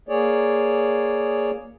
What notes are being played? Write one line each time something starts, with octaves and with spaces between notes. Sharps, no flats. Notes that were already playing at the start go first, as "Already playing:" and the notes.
A#3 G#4 C#5 D5